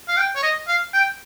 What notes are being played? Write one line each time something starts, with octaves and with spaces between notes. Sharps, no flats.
F5
G5
C#5
D#5
F5
G5